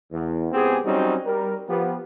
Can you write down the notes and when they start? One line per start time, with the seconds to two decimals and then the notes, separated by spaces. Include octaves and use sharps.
0.12 E2
0.52 C#2 B3 C4 G4 G#4
0.85 F#3 G3 C4 C#4 D#4 F#4
1.25 G3 A#4
1.68 F3 B3 G4